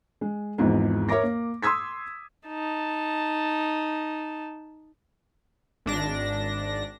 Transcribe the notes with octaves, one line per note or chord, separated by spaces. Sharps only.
G#3
G#1 E2 G#2 F3
A#4 C#5 E5 A#5 D6 A#6
A#3
C6 D#6 E6 G#6 B6
D#4 A5
G#1 D4 A#6